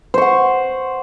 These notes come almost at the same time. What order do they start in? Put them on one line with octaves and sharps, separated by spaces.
C5 C#6 F#5